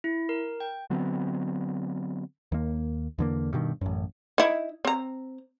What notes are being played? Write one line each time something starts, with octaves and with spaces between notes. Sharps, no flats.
E4
A#4
G5
D3 F#3 B3 C4
D#2 A#3
E2 D3 A#3
G2 B2 D#3
A1 F#2
D#4 E4
C4 A#5